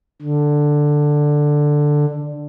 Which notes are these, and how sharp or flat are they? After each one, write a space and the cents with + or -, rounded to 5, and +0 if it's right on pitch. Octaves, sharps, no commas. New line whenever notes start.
D3 +5